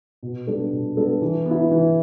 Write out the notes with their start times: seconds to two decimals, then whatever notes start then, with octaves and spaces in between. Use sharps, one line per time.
0.23 B2
0.47 G3 B3 D4 A4
0.72 B2
0.97 G3 B3 D4 A4
1.22 E3
1.46 B3
1.51 E4
1.71 E3